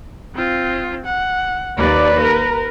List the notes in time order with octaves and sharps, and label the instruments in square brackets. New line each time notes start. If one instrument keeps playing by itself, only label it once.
[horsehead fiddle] C4 F4
F#5
[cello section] D#2 D5 [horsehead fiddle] B4
[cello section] A#4